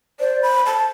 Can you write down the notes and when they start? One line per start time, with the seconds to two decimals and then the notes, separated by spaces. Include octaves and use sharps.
0.20 C5 D5
0.42 B5
0.66 A5